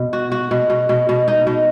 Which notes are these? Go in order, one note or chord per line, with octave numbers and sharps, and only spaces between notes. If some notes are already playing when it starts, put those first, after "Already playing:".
Already playing: B2
F#4
F#4
B2
B2
B2
B2
D#4
B2